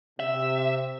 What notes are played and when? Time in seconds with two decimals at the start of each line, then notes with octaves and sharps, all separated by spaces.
0.20 C3 E5